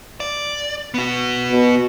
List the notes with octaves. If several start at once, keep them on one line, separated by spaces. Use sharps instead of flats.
D5
B3 F#4
B2